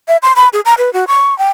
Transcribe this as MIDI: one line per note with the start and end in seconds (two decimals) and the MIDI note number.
0.08 0.17 76
0.23 0.33 84
0.36 0.48 83
0.53 0.61 68
0.65 0.74 82
0.78 0.92 71
0.93 1.05 66
1.08 1.37 85
1.39 1.50 79